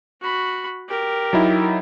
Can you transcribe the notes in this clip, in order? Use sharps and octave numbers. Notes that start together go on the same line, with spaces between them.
F#4 B5
G4 A#4
F#3 D#4 E4